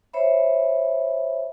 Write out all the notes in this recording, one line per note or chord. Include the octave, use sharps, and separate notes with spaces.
C5 C#5 E5 B5